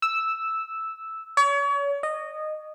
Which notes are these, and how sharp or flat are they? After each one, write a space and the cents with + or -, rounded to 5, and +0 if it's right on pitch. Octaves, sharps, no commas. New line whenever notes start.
E6 -5
C#5 +35
D#5 -15